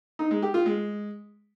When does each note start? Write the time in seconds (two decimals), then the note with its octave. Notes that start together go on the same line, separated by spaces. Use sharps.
0.19 D#4
0.31 G#3
0.42 G4
0.54 F4
0.66 G#3